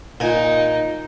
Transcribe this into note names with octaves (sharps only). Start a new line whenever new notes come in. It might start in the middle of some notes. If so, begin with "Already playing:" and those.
A#2 D#4 G#5